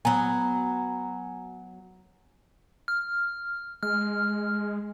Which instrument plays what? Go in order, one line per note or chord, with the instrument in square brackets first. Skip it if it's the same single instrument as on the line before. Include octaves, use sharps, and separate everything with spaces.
[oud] F#3 B3 [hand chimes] G#5 A#5
[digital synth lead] F6
[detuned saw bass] G#3 [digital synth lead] F6